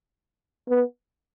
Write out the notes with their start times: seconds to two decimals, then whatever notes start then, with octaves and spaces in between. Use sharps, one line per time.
0.69 B3